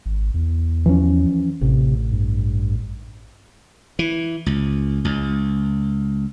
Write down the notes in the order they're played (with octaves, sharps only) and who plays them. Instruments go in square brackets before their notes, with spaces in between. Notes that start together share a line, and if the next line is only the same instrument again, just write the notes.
[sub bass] G#1
E2
[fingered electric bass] E3 F3 C#4
[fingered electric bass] A1 [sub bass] C3
[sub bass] G2
[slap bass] E3
C#2
C#2